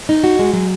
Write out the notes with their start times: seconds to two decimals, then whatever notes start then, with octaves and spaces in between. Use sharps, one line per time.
0.09 D#4
0.24 F#4
0.39 G#3
0.53 F#3